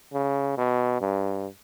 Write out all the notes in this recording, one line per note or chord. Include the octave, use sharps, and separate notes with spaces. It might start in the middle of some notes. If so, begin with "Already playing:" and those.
C#3
B2
G2